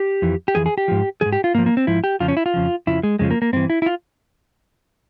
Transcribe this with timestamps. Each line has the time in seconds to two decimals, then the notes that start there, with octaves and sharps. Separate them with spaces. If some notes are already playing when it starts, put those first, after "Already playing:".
Already playing: G4
0.22 F2 E3
0.48 G4
0.55 F2 E3 G#4
0.66 G#4
0.78 G4
0.88 G#2 F3
1.21 F3 G#4
1.26 G#2
1.33 G4
1.44 F4
1.54 G#2 A#3
1.58 F3
1.66 A#3
1.77 C4
1.87 G#2 F3 E4
2.04 G4
2.20 F2 C#3 F3 F4
2.28 C#4
2.37 E4
2.46 F4
2.54 F2 C#3 F3
2.87 F2 C#3 F3 E4
3.03 G#3
3.19 F2 C#3 F3 G#3
3.31 A#3
3.42 A#3
3.53 G2 E3 C4
3.70 E4
3.82 E4
3.86 F4